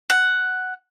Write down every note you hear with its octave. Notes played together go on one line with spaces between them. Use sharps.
F#5